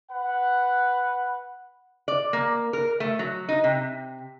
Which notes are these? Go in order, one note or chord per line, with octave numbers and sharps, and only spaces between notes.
B4 F#5
D5
A#3
A#4
A3
F#3
D#4
C3